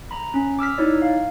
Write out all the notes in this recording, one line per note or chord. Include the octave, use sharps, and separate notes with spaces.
A#5 B5
C#4
D6 E6 F6 B6
D#4 E4 C#5 D5
F5